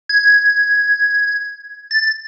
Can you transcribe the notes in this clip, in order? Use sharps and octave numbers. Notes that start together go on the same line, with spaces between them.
G#6
A6